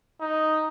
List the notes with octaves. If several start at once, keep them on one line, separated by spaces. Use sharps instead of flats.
D#4